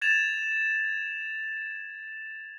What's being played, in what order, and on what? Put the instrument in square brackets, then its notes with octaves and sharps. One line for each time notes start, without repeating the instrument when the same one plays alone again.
[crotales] G#6 A6 E7 F7